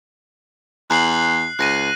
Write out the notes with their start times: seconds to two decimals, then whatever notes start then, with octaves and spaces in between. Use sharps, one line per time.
0.90 E2 F#6 C7 F#7
1.59 C#2 F#6 A#6 D#7